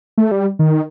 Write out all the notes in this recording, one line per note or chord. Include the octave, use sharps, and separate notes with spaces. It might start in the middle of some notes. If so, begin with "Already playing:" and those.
A3
G3
D#3